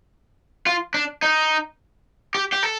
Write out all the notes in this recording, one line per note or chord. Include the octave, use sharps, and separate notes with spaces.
F4
D4
D#4
G4
G4
A4